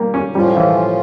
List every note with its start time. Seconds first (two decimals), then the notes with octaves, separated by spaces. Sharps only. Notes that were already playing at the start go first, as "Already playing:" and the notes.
Already playing: G3 A#3
0.14 C#4
0.35 A2 F3 G3 C#4 F4
0.57 E3